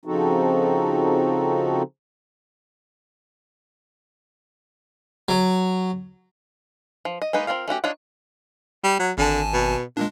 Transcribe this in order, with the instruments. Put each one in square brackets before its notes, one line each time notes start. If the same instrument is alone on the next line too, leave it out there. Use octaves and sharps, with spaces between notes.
[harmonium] C#3 F3 C4 D#4 F#4 A4
[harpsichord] F#3
[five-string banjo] F3
D#5
G#3 A#3 B3 D#4 B4
C4 D4 F4 A#4 F5
A3 C#4 F#4 G4
D4 D#4 F4 C#5 F#5
[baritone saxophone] G3
F#3
[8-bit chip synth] G#1 G#5 A5 [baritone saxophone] D3
[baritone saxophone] B2
[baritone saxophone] A#2 [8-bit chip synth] G#3 D4